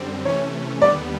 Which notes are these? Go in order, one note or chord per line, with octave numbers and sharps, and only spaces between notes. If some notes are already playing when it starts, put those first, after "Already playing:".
Already playing: F#2 D3 G3 C4
C3 E3 A3 C#4 C#5
D#2 D3 G3 B3 D5